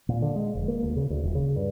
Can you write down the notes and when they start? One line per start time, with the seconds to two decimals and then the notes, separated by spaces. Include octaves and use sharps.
0.09 A#2
0.22 D3
0.36 G#3
0.55 F1
0.68 A#3
0.83 D2
0.96 C#3
1.10 D2
1.23 D#1
1.35 C#3
1.56 G2